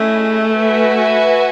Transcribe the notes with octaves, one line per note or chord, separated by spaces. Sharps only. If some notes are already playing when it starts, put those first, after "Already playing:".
Already playing: A3 C#4 E4 G#4 D#5
F#4 B4 E5 G#5